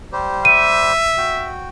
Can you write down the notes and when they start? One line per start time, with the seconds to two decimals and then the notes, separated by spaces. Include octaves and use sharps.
0.13 G3 G4 C5
0.45 E5 D#7
1.18 F#4 G5